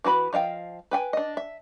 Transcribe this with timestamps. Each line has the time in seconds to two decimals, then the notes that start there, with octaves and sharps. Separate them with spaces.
0.04 E3 F#4 B4 B5
0.33 F3 D#5 F5 G5
0.91 B4 G5 G#5
1.13 D4 D#5
1.37 E5